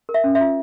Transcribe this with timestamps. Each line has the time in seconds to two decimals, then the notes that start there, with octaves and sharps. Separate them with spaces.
0.09 A#4
0.14 E5
0.24 C#4
0.35 E5
0.41 F4